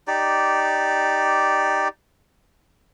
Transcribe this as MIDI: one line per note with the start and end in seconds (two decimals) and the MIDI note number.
0.08 1.88 63
0.08 1.88 67
0.08 1.88 74